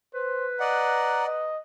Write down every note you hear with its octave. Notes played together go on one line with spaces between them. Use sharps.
B4 C5
D5 D#5 F#5 A#5
D#5